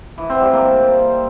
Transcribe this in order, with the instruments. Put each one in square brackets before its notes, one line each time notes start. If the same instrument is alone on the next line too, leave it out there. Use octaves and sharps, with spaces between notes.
[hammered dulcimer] E3
C4
G3
A#3